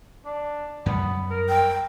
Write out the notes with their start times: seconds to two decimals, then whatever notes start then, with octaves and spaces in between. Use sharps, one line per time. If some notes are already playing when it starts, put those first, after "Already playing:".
0.25 D4
0.86 F#2 G3 B3
1.31 A#4
1.49 G5